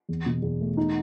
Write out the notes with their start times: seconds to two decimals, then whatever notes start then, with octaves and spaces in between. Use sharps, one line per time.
0.09 E2
0.26 B2
0.42 E2
0.61 A3
0.77 D#4